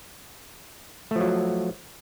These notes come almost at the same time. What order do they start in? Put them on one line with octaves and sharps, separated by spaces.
A3 F3 F#3